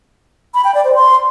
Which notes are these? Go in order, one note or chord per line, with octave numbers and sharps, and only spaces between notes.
B5
G5
D5
C5
C6